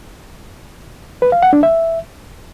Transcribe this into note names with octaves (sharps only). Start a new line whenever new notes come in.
B4
F5
F#5
D4
E5